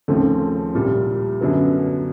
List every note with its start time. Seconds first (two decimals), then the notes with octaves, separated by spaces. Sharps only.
0.08 D#2 C#3 F3 A3 C4
0.74 C2 A#2 G3
1.41 F#2 D3 F#3 B3